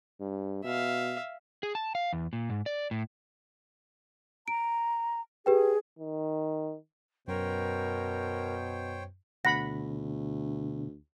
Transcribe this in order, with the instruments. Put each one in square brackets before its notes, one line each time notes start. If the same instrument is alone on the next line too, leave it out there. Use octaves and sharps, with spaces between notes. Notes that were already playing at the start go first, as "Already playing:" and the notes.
[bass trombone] G2
[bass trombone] B2 [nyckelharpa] E5 F5
[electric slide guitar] G#4
A5
F5
E2
A#2
G#2
D5
A2
[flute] A#5 [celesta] D7
[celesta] G4 B4 G5 [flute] G#4
[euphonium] D#3
[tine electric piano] F#2 [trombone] B2 [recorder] A#4 [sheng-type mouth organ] C5 C#5 G5
[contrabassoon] D2 [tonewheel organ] B2 D3 [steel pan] F#5 B5 [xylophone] A#6